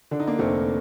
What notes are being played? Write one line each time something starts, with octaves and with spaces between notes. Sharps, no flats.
D3 D4
D#4
A#3 D4
F1 A3 C4